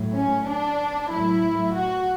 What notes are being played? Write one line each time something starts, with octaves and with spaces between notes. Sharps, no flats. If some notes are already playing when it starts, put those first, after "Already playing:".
Already playing: A2 F#3
C#4
D4
A2 F#3 E4
F#4